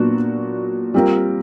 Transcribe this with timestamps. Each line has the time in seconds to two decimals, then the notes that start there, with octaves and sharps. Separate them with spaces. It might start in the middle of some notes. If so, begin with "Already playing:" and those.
Already playing: A#2 F#3 B3 D4 F#4
0.94 G3 C4 F4 A#4